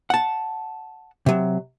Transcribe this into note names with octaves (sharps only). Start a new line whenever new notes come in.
F#5 A5
C3 F#3